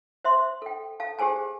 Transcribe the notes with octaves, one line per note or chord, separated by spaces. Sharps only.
C5 E5 C6
A4 G5
A4 F5 A5
G4 G#4 C5 G#5 A5